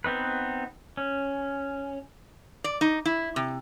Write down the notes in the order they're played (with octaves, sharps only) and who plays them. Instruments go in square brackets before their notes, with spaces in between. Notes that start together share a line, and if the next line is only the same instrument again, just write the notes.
[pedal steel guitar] B3 C4 D#4 B4
C#4
[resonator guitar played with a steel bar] D5
D#4
E4
C3